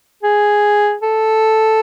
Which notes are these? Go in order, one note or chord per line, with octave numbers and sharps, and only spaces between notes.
G#4
A4